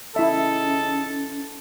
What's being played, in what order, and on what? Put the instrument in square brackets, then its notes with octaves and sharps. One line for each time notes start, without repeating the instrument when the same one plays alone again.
[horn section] C#3 D#4 A4 [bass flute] C#4 [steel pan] E4 E5